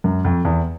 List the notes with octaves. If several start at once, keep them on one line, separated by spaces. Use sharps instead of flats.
F#2
F2
E2